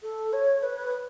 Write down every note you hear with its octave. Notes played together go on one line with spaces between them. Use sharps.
A4
C#5
B4